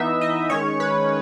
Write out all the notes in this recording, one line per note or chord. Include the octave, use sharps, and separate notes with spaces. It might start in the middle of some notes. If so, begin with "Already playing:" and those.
Already playing: E3 B3 D#4 E5
D#5
D#3 G#3 C#4 C#5
B4